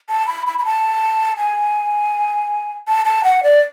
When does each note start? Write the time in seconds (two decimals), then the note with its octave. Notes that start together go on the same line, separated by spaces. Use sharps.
0.09 A5
0.27 B5
0.47 B5
0.59 B5
0.65 A5
1.38 G#5
2.88 A5
3.05 A5
3.24 F#5
3.43 D5